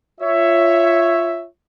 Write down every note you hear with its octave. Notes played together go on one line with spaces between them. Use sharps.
F4 C#5 E5